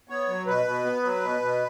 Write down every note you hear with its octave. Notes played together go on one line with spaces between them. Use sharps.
B3 C#5
F#3
B2 B4
B2
B3
F#3
B2
B2